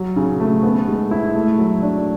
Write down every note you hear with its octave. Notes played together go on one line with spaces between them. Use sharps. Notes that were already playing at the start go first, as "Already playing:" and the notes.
Already playing: F#3
C#3
A3
B3
G#3
E4
A3
F#3
D4